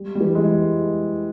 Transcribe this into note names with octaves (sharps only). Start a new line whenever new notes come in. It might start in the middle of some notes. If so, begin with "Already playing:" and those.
Already playing: G3
G3
E3
G#3